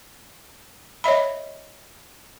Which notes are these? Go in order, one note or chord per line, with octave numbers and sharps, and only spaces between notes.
C#5 D#5 E5 B5